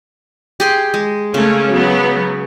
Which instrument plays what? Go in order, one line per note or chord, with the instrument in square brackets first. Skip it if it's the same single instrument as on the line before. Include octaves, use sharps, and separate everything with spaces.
[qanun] G4 G#4 C6
G#3
[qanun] C#3 [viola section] A3 A#3 C#4
[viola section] F#3 B3